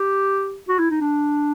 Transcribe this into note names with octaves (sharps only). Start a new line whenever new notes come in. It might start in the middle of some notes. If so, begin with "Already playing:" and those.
Already playing: G4
F#4
E4
D#4
D4